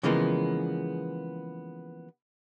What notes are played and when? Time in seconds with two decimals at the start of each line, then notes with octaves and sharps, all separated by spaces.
0.03 C#3 E3 F3 G#3 A#3 B3